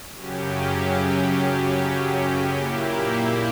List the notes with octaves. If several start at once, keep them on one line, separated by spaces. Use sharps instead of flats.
F#2 C#3 F#3 C#4 G4
A#2 A#3 E4 G4